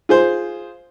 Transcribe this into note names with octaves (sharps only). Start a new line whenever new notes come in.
F4 G#4 C5